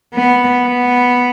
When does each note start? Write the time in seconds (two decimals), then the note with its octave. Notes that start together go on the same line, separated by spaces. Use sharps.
0.14 B3
0.67 B3